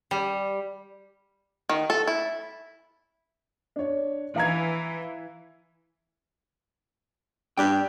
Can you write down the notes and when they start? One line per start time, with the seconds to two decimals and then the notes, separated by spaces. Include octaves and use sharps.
0.11 G3
1.69 D#3
1.90 A4
2.07 E4
3.76 D4 C#5
4.36 E3 F5 A#5 G#6
7.58 G2 G4 D5 G5